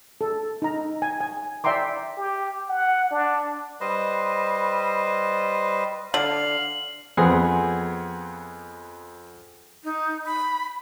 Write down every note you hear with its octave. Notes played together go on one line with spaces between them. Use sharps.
A4
D#4 A#5
G#5
G#5
D5 E5 G5 A#5 C6 D6
G4
F#5
D4
G3 B4 C5 D#5
D3 F5 F#7
F2 B3 G#4 C5
D#4
B5